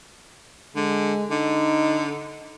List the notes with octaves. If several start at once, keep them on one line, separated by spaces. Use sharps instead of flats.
D3 G#3
D3 D#4